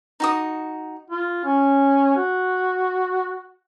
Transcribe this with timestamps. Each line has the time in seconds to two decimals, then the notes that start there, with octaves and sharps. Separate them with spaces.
0.20 D#4 F#4 D#6
1.10 F4
1.45 C#4
2.17 F#4